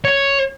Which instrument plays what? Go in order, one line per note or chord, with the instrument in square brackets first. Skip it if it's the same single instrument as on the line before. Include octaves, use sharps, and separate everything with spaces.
[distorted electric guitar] C#5